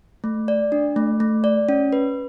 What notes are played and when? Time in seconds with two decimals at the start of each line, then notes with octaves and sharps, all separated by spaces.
0.24 A3
0.48 D5
0.72 D4
0.96 A3
1.20 A3
1.44 D5
1.69 C#4
1.93 B4